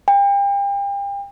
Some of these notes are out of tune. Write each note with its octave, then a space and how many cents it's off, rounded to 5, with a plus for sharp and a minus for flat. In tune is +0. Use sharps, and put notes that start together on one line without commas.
G5 +35